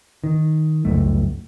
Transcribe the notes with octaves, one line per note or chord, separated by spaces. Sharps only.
D#3
C#2 F#2 A3